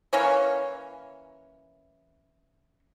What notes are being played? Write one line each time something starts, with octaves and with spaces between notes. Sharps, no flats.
E3 A#3 C#4 C#5